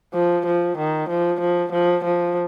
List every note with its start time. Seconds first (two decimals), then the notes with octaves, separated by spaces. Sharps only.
0.14 F3
0.46 F3
0.78 D#3
1.09 F3
1.41 F3
1.72 F3
2.04 F3